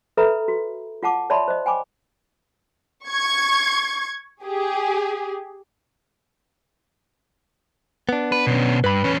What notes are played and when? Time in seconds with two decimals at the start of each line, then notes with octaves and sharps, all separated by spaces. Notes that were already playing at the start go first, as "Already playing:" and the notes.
0.17 A4 B4 E5 A#5 B5
0.48 F#4
1.03 F4 F#5 A5 D6
1.30 C#5 D5 E5 A5 B5 C6
1.48 C5 D#5
1.66 G5 G#5 B5 D6
3.09 C#6 G#6
4.43 G4 G#4
8.09 B3 D4
8.32 B4
8.47 B2 C#4
8.84 G2 B4 B5
9.04 E2 C#4